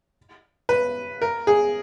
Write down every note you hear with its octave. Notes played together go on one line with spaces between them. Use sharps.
B4
A#4
G#4